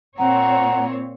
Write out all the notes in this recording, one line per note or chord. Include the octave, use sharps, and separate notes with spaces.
A#2 C4 C#5 F#5 A#5